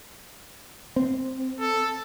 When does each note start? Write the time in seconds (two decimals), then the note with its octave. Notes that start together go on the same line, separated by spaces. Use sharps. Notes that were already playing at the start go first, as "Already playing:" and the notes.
0.96 C4
1.60 A4